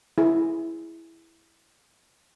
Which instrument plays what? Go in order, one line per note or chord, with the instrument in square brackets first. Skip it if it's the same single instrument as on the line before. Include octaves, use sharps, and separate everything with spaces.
[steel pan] E4 G#4